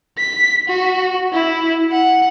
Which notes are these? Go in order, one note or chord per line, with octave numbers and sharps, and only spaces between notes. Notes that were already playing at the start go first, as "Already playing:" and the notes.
B6
F#4
E4
F#5